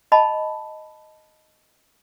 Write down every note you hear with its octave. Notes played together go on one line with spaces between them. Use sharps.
D#5 A5 B5